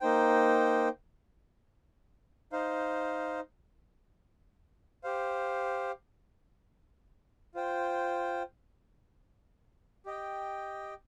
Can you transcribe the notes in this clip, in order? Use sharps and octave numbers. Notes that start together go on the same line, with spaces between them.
A#3 D#4 C5 G5
D#4 C5 F5
G4 C5 F5
F4 C5 G5
G4 D#5 G5